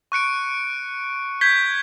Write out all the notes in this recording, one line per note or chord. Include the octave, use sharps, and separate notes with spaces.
C#6 F#6 C#7 D7
G6 G#6 B6 G7